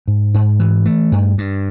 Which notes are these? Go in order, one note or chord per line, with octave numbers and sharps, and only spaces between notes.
G#2
G#2
E3
A3
G2
G2